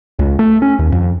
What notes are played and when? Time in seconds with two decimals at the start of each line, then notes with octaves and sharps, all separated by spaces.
0.19 C#2
0.39 A3
0.62 C#4
0.79 D#2
0.92 F2